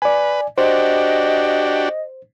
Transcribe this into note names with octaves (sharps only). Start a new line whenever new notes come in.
B4 D5 G#5
D4 F#4 G4 C5 D#5